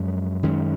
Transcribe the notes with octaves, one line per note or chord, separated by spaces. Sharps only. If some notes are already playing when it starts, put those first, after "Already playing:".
Already playing: F#2 F3 G#3
F#2 D#3 G#3 C#4